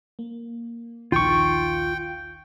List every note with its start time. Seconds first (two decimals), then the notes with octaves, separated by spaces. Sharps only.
0.19 A#3
1.12 A#1 D#2 D#3 F4 G5 C#6